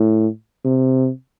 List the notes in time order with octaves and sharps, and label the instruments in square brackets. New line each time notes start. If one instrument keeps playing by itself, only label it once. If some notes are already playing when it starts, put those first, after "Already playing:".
Already playing: [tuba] A2
C3